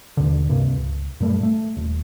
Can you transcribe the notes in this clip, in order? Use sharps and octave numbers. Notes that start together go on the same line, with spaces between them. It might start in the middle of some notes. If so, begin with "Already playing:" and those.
D#2 B2 D3
C#2 G2 C3 A#3
C#2
F#2 A#2 G3 A3
A3
D#1